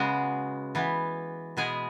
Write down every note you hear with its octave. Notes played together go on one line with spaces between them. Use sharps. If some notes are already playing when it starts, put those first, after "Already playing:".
Already playing: C#3 G#3 B3 F#4
E3 B3
B2 G#3 B3 G#4